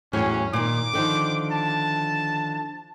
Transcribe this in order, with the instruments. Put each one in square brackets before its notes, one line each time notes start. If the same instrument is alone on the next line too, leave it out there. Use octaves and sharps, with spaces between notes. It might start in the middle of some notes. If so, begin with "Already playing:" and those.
[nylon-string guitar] E2 A2 F#3 [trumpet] C#4
[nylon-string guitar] A#2 D#3 [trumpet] D6
[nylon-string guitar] D3 D#3 F3
[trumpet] A5